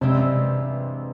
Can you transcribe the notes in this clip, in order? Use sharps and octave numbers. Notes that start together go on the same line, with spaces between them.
G2 C3 E3 G#3 C4 G4